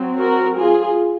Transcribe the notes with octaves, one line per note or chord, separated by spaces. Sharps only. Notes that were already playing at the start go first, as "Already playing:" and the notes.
Already playing: F#3 C4
F#4 A#4
F4 G#4